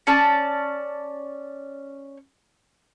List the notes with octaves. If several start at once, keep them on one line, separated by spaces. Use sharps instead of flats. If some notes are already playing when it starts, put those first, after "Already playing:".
C#4 D5 A5